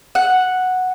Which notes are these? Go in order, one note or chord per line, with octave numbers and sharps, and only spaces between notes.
F#5